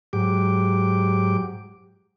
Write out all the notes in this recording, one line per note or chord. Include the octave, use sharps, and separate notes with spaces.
G#2 F#3 G4 D6